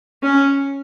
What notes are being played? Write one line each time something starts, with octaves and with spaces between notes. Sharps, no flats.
C#4